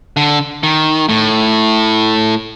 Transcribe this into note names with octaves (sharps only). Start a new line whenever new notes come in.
D3
D#3
A2